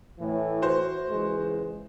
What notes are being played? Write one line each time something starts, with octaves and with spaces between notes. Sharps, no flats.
A2 E3
F#4 C5
C#2 E3 G#3